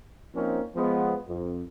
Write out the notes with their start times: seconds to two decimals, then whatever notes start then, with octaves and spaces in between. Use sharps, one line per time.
0.34 F3 A#3 C4 C#4 D#4
0.75 F3 G#3 B3
1.28 F2